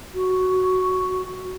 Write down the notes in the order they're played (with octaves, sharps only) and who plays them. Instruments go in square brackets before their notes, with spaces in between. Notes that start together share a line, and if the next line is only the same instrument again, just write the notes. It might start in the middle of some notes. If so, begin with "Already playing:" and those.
[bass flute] F#4